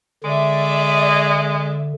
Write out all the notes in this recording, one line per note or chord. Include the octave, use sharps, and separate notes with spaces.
D3 G#3 D5 E5